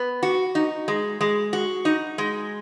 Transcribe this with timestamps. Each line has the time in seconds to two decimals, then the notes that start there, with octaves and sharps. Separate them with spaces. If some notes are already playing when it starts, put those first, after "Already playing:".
Already playing: B3
0.23 F#4
0.55 D#4
0.88 G#3
1.21 G#3
1.53 F#4
1.85 D#4
2.18 G#3